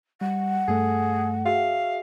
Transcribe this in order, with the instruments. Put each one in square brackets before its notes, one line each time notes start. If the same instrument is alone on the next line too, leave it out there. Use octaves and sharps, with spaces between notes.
[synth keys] G3 [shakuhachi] F#5
[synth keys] G2 A3 A4 [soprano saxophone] G#4
[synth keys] F#4 G#4 E5 [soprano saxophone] F5